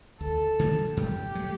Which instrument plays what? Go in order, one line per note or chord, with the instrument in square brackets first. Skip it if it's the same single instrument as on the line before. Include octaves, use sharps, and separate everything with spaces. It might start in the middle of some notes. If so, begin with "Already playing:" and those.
[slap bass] D2 [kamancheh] A4
[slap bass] D3 G3 A#3
[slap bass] F#2 [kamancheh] G4
[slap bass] F#3 A3